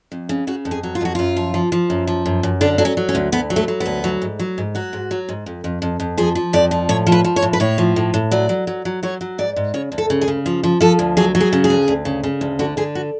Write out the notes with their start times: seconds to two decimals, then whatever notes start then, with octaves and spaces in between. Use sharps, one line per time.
0.12 F2
0.29 C#3
0.47 C#3 F#4
0.65 F2
0.71 G#4
0.83 F#3
0.95 F4
1.01 F2 F#4
1.15 F#2 F4
1.36 F3
1.54 F3
1.72 F3
1.90 F#2
2.07 F3
2.26 F#2
2.43 F#2
2.61 D3 D4
2.78 F#3 D4
2.85 C#4
2.97 F#3
3.09 C#4
3.15 D2
3.32 D2 B3
3.50 F#3
3.56 A3
3.68 F#3
3.80 B3
3.86 D2
4.04 F#3
4.22 G#2
4.39 F#3
4.58 G#2
4.75 F#3 F#4
4.93 G#2
5.11 F#3
5.29 G#2
5.46 F2
5.64 F2
5.82 F2
6.00 F2
6.18 F3 G#4
6.35 F3
6.53 F2 D5
6.71 F3
6.89 A2 C#5
7.07 F3
7.12 B4
7.24 F3
7.36 C#5
7.42 A2
7.53 B4
7.60 A2 C#5
7.78 F3
7.96 A2
8.14 A2
8.31 F#3 D5
8.49 F#3
8.67 F#3
8.85 F#3
9.03 F#3 C#5
9.21 F#3
9.38 G#2 D5
9.56 G#2
9.74 C#3 C#5
9.92 D2
9.98 A4
10.10 C#3
10.21 G#4
10.28 C#3
10.46 F3
10.63 F3
10.81 F3 A4
10.99 D2
11.17 F#3 G#4
11.35 F#3
11.41 G#4
11.53 C#3
11.64 G#4
11.70 D2
11.88 D2
12.05 C#3
12.23 C#3
12.41 D2
12.59 D3 F#4
12.77 D3 G#4
12.95 F#4